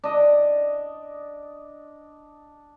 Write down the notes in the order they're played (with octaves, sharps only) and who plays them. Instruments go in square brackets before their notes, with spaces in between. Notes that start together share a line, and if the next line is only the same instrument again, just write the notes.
[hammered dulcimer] D4 D#5